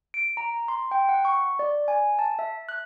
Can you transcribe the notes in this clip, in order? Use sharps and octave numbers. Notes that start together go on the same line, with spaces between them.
D7
A#5
C6
G5
F#5
C#6
D5
G#5
A5
E5
F#6